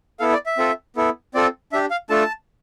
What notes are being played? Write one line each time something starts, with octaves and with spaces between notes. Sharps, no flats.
B3 E4 A4 F5
D5
E5
C4 F4 A4
B3 E4 A4
C4 F4 A4 D5
D4 G4 E5
F5
A3 D4 F4 A4 A5